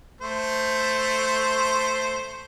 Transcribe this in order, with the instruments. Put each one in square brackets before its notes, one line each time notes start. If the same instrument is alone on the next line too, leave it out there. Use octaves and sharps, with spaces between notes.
[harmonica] A3 C5